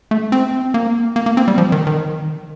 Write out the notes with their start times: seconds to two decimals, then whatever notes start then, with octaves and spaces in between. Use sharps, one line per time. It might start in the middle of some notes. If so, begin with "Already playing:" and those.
0.11 A3
0.32 C4
0.74 A#3
1.16 A#3
1.26 A#3
1.37 C4
1.48 G3
1.58 F3
1.72 D#3
1.87 D#3